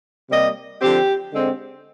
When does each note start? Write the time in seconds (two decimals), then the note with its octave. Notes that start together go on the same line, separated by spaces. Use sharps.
0.30 C3 G3 A#3 D#5
0.81 D3 F3 C4 G4
1.33 D3 G#3 C4